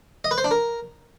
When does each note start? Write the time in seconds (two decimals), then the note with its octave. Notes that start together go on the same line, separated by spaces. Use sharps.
0.24 D#5
0.31 B4
0.38 C5
0.44 D4
0.51 A#4